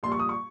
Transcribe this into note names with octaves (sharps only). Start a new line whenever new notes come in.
A#1 A#2 G3 C6
C#6
D#6
C#6